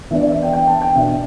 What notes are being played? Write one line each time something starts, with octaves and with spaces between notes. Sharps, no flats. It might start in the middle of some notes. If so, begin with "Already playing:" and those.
E3 B3 D4 E5
D5
E5
G5
G5
A5
G5
B2 B3 D4 E5